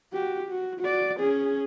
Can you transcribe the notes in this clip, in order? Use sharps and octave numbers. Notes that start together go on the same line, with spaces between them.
F#4 G4
F#4
F#4 D5
C#4 G#4